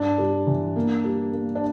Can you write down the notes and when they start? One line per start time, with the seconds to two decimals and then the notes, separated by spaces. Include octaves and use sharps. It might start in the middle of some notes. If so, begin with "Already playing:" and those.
Already playing: G2 D4
0.18 G3
0.47 E3
0.76 A#3
1.04 G3
1.33 A#3
1.55 D4